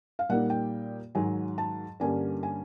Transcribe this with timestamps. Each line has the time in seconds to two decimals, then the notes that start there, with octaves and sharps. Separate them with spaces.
0.19 F5
0.29 A#2 G3 A#3 D#4 F#5
0.50 G5
1.15 G#2 D#3 F#3 G#5
1.58 A5
2.00 G2 D3 G3 A#3 C#4 G#5
2.43 G#5